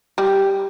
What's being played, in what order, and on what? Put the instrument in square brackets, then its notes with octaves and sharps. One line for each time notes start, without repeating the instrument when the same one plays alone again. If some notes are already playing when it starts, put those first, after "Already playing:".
[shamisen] G3